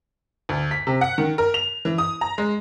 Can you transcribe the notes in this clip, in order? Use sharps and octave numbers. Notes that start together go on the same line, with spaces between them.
D2
B6
C3
F#5
D#3
A#4
F7
E3
D#6
A#5
G#3